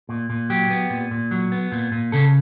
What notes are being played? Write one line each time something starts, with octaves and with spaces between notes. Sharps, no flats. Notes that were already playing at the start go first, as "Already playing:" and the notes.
A#2
A#2
F#3 G4
B3
A#2
A#2
F#3
B3
A#2
A#2
C#3 A4